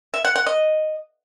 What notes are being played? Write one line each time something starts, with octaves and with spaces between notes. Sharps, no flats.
E5
F#5
F#5
D#5